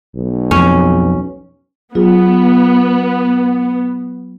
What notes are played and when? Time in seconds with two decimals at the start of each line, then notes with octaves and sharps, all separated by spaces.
0.16 B1
0.51 F2 C#4
1.95 F#3 B3 F4 G#4